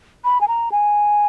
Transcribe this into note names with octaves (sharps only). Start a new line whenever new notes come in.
B5
G#5
A#5
G#5